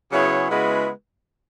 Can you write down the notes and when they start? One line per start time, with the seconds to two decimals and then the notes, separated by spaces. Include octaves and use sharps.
0.12 C#3 F#3 B3 E4 G#4 C#5
0.51 C#3 G#3 B3 E4 F#4 B4